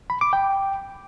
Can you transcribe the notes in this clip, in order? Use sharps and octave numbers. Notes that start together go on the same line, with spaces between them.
B5
D6
G5